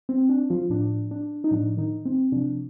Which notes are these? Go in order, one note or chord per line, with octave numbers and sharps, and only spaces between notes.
C4
D4
F3 F4
A2 F3 D4
D4
D#4
A2 F3 D4
D#3 D#4
C4
C3 F3 D4